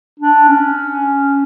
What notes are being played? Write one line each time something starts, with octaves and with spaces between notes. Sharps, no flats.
D4
C#4